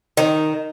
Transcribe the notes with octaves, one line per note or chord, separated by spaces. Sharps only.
D#3